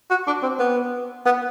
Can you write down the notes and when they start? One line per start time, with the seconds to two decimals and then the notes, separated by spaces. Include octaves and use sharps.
0.10 F#4
0.27 D4
0.43 C4
0.59 B3
1.26 B3